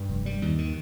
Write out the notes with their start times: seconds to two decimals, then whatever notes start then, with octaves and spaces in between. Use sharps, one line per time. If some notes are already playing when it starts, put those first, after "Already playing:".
Already playing: G2
0.09 F1
0.26 G3
0.42 D#2
0.58 D#3